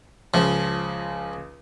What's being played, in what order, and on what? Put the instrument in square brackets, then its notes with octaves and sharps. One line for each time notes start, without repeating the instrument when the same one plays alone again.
[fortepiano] C#2 C#3 [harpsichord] F3